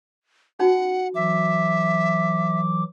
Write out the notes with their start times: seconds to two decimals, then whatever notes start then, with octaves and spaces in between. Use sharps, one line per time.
0.59 C#4 D#4 F#4 F#5
1.15 E3 F#3 E5 D6